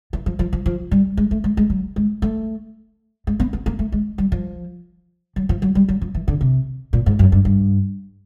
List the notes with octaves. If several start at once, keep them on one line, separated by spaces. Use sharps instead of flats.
E3
F3
F3
F3
F3
G3
G#3
A3
G#3
G#3
F#3
G#3
A3
G#3
B3
B3
A#3
A3
G#3
G3
F3
F#3
F3
F#3
G3
F#3
F3
E3
D3
C3
A#2
G#2
F#2
G2
G2